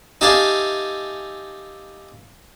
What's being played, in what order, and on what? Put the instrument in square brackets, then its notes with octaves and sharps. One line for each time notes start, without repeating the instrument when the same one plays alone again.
[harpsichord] D#4 G4 A4 E5 F5 G#5